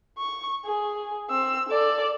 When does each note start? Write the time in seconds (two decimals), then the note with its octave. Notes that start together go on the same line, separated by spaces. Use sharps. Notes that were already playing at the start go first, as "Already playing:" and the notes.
0.18 C#6
0.65 G#4
1.30 C4 E6
1.69 A4 D5